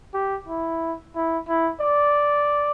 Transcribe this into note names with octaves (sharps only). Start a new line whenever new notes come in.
G4
E4
E4
E4
D5